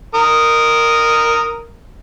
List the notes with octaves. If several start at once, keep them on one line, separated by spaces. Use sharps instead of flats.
A#4 D#6